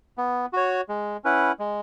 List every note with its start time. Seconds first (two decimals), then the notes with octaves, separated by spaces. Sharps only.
0.18 B3
0.53 F#4 C#5
0.89 G#3
1.24 C#4 E4 B4 F#5
1.59 G#3